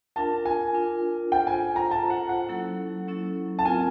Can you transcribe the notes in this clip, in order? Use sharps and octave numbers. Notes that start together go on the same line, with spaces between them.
D4 F4 A#4 A5
G#5
D4 F4 A#4
F4 A4 C5 G5
G#5
A#5
F4 A4 C5 A5
F#5
F#5
F#3 A#3 C#4 E4 A4
F#3 A#3 C#4 E4 A4
A5
C4 F4 A#4 G#5